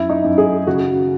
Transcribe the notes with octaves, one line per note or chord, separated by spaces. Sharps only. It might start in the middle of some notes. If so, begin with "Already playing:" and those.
Already playing: F#2 E4
D#4
F#2
G#4
C#3 F#4